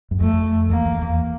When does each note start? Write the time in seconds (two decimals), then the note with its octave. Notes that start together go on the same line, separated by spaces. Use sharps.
0.11 F#2
0.21 F2 A3
0.69 E2 A#3
0.86 E2
1.02 E2